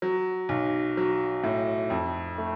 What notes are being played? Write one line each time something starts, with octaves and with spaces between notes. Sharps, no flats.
F#3
B1
F#3
A2
F2
A3